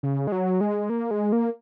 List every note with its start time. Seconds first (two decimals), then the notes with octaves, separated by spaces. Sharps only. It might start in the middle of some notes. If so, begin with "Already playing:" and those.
0.03 C#3
0.27 G#3
0.32 F#3
0.61 G#3
0.90 A#3
1.11 G#3
1.32 A#3